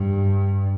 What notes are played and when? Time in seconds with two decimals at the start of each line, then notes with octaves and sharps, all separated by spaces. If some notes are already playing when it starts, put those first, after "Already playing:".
Already playing: G2